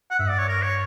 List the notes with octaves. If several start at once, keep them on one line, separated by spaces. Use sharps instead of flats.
F#5
G2 E5
D5
C#5
A#4
C#5